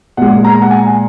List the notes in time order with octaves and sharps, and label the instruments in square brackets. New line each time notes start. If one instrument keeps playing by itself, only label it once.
[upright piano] A#2 G#3 F#5
A#5
F#5
G#5